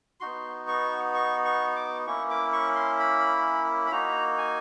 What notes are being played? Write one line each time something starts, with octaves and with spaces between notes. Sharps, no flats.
B3 D#4 F#4 C6
C#6
C#6
C#6
D6
A#3 C#4 E4 C#6
D6
C#6
C6
B5
B5
A#3 D#4 F#4 A#5
G#5